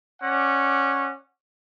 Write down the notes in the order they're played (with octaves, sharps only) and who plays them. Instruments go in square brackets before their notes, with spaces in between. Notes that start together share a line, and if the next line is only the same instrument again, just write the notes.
[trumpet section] C#4 D5 F#5